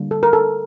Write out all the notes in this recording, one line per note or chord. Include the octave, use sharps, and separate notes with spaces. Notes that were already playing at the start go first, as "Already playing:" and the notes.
Already playing: D3 G3 A#3
A4
A#4
A4